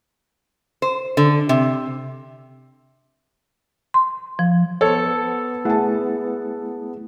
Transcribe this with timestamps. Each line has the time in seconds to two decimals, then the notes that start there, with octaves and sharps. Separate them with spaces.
0.82 C5
1.17 D3
1.49 C3
3.94 C6
4.39 F3
4.81 B3 A4 C5 C#5
5.65 A3 E4 G#4 F#5 A5